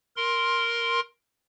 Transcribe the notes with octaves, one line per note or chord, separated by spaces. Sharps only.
A#4 C6